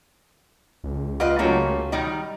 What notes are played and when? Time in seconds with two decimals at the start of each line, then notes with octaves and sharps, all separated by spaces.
0.84 C#2
1.20 F4 G4 B4 D#5
1.39 F#3 A3 A#3 C#4 F4 G4
1.92 D#3 G3 D#4